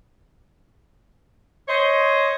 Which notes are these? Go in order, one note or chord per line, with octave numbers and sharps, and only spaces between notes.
C5 C#5 D#5